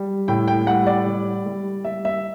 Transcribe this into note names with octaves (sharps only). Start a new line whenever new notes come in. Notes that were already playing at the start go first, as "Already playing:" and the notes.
Already playing: G3
A2 G5
G5
G3 F#5
D5
G3
G3
G3 E5
E5